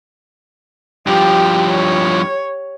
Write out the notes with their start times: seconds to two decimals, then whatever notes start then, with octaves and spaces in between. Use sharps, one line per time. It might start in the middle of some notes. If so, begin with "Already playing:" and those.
1.07 G2 F3 G4
1.69 C#5